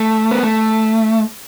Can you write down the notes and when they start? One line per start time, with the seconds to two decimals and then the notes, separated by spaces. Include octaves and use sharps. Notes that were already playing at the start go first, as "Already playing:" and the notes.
Already playing: A3
0.31 B3
0.43 A3